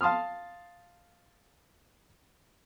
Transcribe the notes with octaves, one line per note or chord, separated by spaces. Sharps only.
F5 A5 C6 D#6 F6